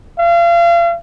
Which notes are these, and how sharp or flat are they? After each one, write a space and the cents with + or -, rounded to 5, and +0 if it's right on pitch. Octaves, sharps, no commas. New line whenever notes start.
F5 -35